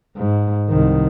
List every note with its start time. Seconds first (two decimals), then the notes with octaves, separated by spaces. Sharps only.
0.17 G#2
0.69 C2 D#3